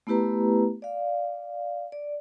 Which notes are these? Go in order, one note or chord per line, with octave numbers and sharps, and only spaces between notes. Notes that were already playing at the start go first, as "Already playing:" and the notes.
A3 B3 E4 G4 B4 A#5
D5 F5
D5